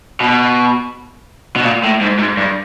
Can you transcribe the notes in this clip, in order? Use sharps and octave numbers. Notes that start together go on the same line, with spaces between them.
B2
B2
A#2
A2
G#2
G#2
G2